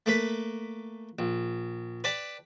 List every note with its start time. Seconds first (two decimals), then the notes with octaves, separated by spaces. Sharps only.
0.06 A3 A#3 B4 B5
1.19 A#1
2.04 B4 D5 G5 A5 B5